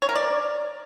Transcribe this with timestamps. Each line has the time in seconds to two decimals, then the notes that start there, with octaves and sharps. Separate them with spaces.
0.02 C#5
0.09 A#4
0.15 D5